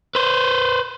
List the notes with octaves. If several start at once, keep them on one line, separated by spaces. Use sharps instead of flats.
B4 C5